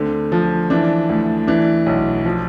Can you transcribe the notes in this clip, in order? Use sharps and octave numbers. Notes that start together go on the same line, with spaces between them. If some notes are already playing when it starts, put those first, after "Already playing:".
Already playing: D2 D3 C4
F3
E3 D4
D2
E3 D4
B1
F3